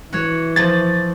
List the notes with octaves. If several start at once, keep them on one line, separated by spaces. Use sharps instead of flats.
E3 F#4 C#5
F3 A6